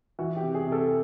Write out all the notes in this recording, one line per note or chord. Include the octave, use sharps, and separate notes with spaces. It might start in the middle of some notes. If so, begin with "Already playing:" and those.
E3 F#4
G4
C3
G#4
C3
A4